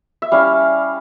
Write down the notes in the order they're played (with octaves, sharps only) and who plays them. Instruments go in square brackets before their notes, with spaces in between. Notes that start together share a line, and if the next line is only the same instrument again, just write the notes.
[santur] E5
G3 C#4 E4 F5